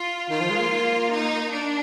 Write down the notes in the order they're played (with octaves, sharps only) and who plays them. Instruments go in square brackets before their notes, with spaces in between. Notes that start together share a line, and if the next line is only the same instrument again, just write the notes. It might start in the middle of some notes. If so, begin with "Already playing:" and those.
Already playing: [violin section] F4
[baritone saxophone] D#3 [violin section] F4
[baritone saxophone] F3
G#3
A#3
[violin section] D#4
D4